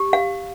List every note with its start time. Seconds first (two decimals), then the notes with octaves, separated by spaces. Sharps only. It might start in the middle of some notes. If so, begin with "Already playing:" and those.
Already playing: G4
0.13 F5